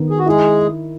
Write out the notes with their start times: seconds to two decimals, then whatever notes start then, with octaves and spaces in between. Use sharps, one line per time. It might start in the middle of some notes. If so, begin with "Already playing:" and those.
Already playing: D#3 B3
0.10 G#4
0.18 F#4
0.26 G#3 E4 G#4